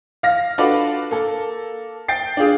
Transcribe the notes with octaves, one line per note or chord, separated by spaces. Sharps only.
F5 A#6
D4 F4 F#4 A4 B4 D5
A#3 A4
G5 A6 C7
D4 F4 G#4